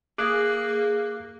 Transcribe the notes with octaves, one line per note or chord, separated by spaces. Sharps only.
A#3 G#4 D6 F#6